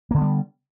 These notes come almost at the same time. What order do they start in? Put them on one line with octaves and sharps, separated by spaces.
A#3 D3 B3 G3